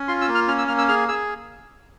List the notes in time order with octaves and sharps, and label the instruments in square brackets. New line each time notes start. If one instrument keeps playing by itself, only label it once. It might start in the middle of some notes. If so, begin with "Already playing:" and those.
Already playing: [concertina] C#4
F4 C6
E6
A#3
F6
C#4 F6
E6
A#3 F6
E6
G#4 F6
G#4 E6